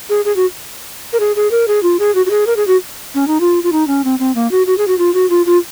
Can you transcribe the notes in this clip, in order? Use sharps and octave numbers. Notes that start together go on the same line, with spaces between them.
G#4
G#4
F#4
A#4
G#4
G#4
A#4
G#4
F4
G#4
F#4
F#4
G#4
A#4
G#4
F#4
C#4
D#4
F4
F4
D#4
C#4
C4
C4
A#3
F#4
F#4
G#4
F#4
F4
F#4
F4
F4